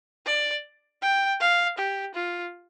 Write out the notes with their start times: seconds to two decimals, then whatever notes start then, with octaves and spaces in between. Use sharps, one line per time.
0.26 D5
1.02 G5
1.40 F5
1.78 G4
2.15 F4